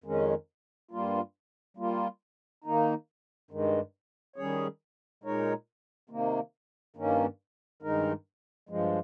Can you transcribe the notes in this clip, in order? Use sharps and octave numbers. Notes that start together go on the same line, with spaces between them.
F2 D#3 G#3 C#4
G2 G3 A#3 F4
G3 A#3 F4
D#3 A#3 D#4
G2 D#3 G#3
D#3 G3 C#4 G#4 C#5
A#2 G#3 D#4 A#4 C#5
C3 D#3 A#3
G2 D#3 A#3 C#4
G2 D#3 G#3 D#4 A#4
G2 F3 G#3